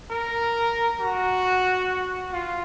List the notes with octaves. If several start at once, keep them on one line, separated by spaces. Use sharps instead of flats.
A#4
F#4
F4